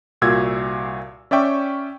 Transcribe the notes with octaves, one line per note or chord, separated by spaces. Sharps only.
C2 A#2 F#4 E6 G#6
C#4 D5 E5 G5 C#6